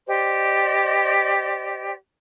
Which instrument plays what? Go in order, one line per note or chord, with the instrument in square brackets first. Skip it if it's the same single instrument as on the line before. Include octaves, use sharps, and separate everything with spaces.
[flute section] G4 C5 D5 D#5